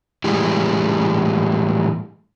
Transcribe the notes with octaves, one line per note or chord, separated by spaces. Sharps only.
A2 E3 G3 G#3